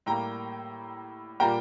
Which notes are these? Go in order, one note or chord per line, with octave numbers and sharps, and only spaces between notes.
A2 G3 A#3 G5 A#5
A#2 G3 A#3 G5 A#5